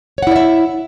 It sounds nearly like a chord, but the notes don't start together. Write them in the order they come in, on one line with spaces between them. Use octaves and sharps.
C#5 F#5 E4 D5 E5